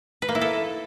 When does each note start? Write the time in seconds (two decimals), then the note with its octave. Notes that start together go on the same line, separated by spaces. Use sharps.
0.22 B4
0.29 A#3
0.35 E4
0.41 A4